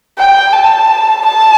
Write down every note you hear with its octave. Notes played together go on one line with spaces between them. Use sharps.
G5
A5
A5